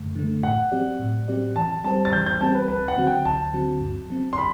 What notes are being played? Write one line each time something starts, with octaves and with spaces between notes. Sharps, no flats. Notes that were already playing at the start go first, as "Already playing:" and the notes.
Already playing: F#2 D3 A3
D3 A3
A2 F#5
F#3 C4 G4 D5
A2
F#3 C4 G4 D5
E3 A5
G3 C4 G4 C5 A5
A6
E3 G6
G6
G3 C4 G4 C5 A5
B4
D2 B4
F#5
D3 F#3 C4 F#4
G5
D2 A5
D3 F#3 C4 F#4
G2
F#3 C4
C6
B5